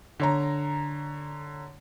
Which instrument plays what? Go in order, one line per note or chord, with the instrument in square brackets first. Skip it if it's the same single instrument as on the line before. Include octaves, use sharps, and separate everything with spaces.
[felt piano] D3 C#5 A#5